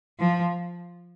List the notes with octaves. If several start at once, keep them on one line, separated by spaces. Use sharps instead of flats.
F3